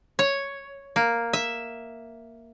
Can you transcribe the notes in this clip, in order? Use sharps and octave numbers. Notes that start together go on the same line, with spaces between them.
C#5
A#3
E5